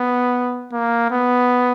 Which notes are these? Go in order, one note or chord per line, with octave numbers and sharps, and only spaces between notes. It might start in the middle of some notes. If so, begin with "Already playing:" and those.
Already playing: B3
A#3
B3